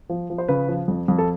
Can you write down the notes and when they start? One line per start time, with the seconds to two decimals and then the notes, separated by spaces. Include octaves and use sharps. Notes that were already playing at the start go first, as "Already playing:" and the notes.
0.10 F3
0.30 F3
0.38 C5
0.48 C#3 B4
0.68 F3
0.88 F2
1.08 F2
1.18 A4